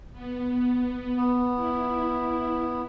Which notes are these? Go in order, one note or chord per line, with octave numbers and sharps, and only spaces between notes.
B3
B3
E4